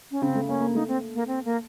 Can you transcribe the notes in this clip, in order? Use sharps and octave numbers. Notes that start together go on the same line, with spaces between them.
C#4
C#3 C4
A3
A#3 C#4
A#3
A3 D#4
C4
A#3
C4
A#3